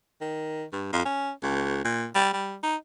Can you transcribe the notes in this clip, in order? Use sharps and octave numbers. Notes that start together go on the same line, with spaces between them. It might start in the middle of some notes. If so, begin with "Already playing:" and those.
D#3
G2
F2
C#4
C#2
A#2
G3
G3
D#4